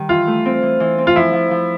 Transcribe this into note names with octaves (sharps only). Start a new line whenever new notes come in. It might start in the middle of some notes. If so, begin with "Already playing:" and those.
Already playing: D#3 G3
E3 F4
A3
C4
E3
E3
C4
F4
F3 E4
F3
F3